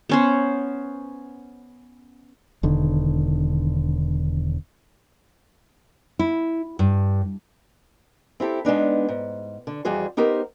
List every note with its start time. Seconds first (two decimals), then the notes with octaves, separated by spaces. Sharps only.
0.09 B3 C#4 C5
2.63 E1 D3 D#3
6.19 E4
6.79 G2
8.40 C4 E4 G4 A4
8.65 G#3 B3 D4 D#4
9.09 G#2
9.67 D3
9.85 F2 E3 G3 F#4 G#4 C5
10.17 B3 D#4 G4 A#4 C5